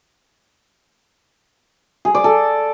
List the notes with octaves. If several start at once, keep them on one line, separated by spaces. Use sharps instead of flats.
G#4
D5
A4